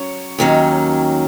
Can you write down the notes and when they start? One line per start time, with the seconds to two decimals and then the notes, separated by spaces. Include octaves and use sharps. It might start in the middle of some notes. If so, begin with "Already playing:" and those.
Already playing: F#3 C#4 C#5
0.39 D#2 D#3 F#3 C#4